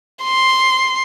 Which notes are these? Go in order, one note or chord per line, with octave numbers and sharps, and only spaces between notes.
C6